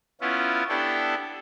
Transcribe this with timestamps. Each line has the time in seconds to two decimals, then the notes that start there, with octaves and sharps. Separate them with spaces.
0.21 B3 C#4 E4 F4
0.69 B3 D4 E4 G4 A4 G5